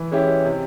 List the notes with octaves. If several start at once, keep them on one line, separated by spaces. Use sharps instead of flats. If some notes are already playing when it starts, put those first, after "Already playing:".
Already playing: E3
G#3 C#4 E4 G4
C3